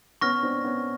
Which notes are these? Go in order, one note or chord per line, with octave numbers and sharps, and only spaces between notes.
B3 C#4 C#6 F6 A#6
C4 D4
B3 C#4